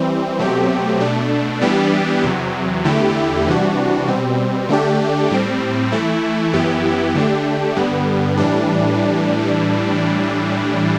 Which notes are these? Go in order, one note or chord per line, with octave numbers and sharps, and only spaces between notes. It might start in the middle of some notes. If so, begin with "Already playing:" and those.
Already playing: E3 G3 C4
B2 F#3 A3 C4 G4
B2 A3 D4
E3 G3 B3 D4 G4
E2 C3 F#3
E2 D3 A3 E4 G4
C3 E3 G3 D4 F#4
B2 G3 C4
D3 A3 D4 G4
A2 G3 C4
E3 A3 E4
F#2 E3 B3 E4 G4
D3 A3 D4 G4
G2 D3 G3 B3
A2 E3 G3 D4